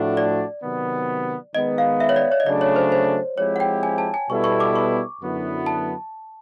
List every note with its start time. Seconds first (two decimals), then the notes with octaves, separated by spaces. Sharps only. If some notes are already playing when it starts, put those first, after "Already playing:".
Already playing: A2 F3 A3 D4 F#4
0.17 D5
0.63 C3 D#3 F#3 B3
1.54 D#3 G#3 B3 D#5
1.78 F5
2.00 E5
2.09 C#5
2.16 D5
2.32 C#5
2.40 D#5
2.46 C#3 F#3 A3 D4 D5
2.61 C#5
2.76 C5
2.92 C5
3.38 F3 G#3 C4 E4 G4 C#5
3.56 F#5
3.60 G5
3.83 G#5
3.98 A5
4.14 G#5
4.29 B2 G3 B3 E4 A4 C#6
4.44 C#6
4.60 D6
4.76 C#6
5.20 F#2 D3 F#3 B3 E4
5.66 A5